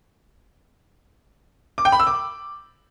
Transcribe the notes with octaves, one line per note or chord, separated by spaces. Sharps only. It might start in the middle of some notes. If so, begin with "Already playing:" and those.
D6
G5
B5
E6
D6